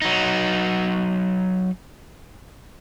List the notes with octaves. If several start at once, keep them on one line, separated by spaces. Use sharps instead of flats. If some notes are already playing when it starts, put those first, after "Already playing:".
F#3 D#4